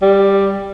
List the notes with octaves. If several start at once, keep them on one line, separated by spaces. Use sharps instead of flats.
G3